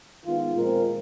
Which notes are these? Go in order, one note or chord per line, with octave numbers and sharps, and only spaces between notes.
D#3 G#3 B3 F4
A#2 F3 G#3 C4 A#4